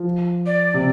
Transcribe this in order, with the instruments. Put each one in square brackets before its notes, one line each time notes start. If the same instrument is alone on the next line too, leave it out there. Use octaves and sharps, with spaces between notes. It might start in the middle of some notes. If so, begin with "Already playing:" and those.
Already playing: [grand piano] F3
[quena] D5
[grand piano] C3